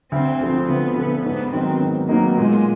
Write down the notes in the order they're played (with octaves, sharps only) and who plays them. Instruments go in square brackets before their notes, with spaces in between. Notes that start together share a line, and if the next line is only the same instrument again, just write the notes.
[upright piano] D2 [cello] C4
[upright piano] D3 F3
[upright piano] D2 [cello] B3
[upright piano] D3 F3 [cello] B3
[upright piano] G#2 [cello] B3
[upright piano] D#3 F#3 B3 D#4 [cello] C4
[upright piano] G#2
[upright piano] D#3 F#3 B3 D#4 [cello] A#3
[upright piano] A#2 [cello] G#3